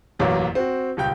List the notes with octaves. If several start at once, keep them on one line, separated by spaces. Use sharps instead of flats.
E1 A1 F#2 F#3 A#3 D6
C4 F#4
D#1 C#2 G5 G6